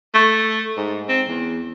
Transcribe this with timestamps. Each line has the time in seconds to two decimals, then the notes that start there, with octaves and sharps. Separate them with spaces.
0.14 A3
0.77 G#2
1.08 C4
1.28 E2